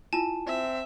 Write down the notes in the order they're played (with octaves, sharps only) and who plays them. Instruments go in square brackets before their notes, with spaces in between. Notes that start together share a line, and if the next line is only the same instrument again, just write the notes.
[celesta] E4 F4 [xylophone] G#5 A5 E7
[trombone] C4 [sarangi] E5